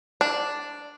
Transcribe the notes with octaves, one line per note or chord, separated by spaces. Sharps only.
D4